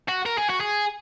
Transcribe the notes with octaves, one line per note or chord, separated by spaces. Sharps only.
F#4
A#4
G#4
F#4
G#4